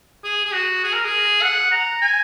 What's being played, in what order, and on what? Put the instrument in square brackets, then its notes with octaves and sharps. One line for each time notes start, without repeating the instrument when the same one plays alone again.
[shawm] G#4
G#4
F#4
G#4
A#4
G#4
F#5
A#5
G#5